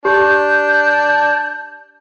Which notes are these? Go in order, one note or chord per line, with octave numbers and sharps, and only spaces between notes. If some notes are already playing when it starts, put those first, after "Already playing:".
D4 G4 G6